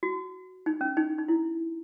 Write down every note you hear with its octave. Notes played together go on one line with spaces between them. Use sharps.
F#4
D#4
C#4
D#4
D#4
E4